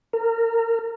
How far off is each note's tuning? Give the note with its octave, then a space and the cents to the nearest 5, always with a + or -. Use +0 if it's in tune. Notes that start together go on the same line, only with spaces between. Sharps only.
A#4 -25